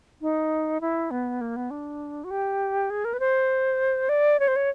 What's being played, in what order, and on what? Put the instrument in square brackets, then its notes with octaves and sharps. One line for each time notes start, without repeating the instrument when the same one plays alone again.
[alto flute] D#4
E4
B3
A#3
B3
D4
F#4
G4
G#4
A#4
B4
C5
D5
C#5
C5
C#5